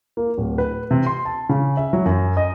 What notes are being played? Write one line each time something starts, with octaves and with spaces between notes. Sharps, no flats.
A#3
D1
B4
C3
C6
A5
C#3
E5
F#3
F#2
D#5